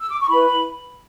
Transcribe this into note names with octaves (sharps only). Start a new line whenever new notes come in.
E6
D6
C#6
E4 B4 B5